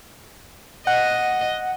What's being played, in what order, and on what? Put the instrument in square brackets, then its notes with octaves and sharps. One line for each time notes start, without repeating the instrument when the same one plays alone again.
[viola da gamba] D#5 [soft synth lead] F#5